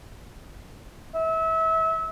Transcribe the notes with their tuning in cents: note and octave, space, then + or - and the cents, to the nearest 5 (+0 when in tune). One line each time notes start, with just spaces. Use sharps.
E5 -30